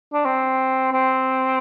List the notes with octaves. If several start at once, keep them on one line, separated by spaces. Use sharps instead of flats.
D4
C4
C4